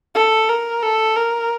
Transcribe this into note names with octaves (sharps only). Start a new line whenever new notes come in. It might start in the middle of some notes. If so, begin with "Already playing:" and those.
A4
A#4
A4
A#4